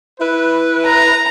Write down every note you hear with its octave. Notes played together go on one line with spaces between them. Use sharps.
E4 B4
A#5